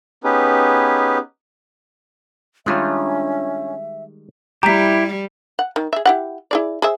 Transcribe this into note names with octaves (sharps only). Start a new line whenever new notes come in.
B3 C#4 D#4 G4 G#4 B4
D#3 G3 G#3 C#4 D4 F4 E5
G3 E4 G4 A#5 B6
F#5
D#3
G#4 E5
E4 G4 F#5
E4 G#4 D5
G#4 C5 E5